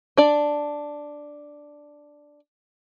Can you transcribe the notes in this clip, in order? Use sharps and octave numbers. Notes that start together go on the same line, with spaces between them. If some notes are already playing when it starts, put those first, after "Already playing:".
D4 D5